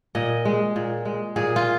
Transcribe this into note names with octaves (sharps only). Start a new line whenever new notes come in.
A#2 D#5
G#3
A#2
G#3
A#2 G#4
F4